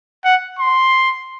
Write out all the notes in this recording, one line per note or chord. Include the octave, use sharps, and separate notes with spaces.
F#5
C6